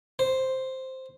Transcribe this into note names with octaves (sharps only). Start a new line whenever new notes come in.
C5